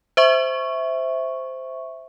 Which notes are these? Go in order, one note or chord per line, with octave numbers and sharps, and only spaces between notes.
C5 E5 C#6